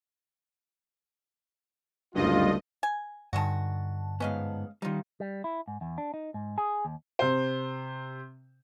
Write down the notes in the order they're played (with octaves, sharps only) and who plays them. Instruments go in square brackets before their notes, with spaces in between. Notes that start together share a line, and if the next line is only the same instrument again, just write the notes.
[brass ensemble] F#1 D2 F4 [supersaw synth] G2 D#5
[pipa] G#5
[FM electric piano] G2 D3 A5 [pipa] D#3 G#3 F#4
[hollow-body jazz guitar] G#2 B3 [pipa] C#4 D#5 F5
[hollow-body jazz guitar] D#3 G3 [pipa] D#4 F4
[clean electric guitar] G3
E4
G#2
E2
D4
D#4
G#2
G#4
D#2
[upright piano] C3 C5